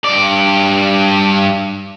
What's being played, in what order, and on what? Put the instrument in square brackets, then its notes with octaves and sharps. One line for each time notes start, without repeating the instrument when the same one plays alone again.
[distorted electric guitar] G2 D5